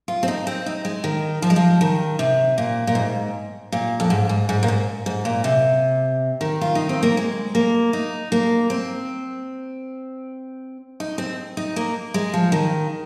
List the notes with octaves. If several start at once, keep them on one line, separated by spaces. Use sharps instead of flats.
F4
C4
D#4
C4
D#4
G#3
D#3
F3
G#3
F3
D#3
C3
A#2
A#2
G#2
A#2
F2
G#2
G#2
G#2
A#2
G#2
G#2
A#2
C3
D#3
F4
D#4
C4
A#3
G#3
A#3
D#4
A#3
C4
D#4
C4
D#4
A#3
G#3
F3
D#3